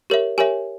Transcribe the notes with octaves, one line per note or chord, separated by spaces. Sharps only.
G4 A#4 C#5 E5
G4 A#4 C#5 E5 G#5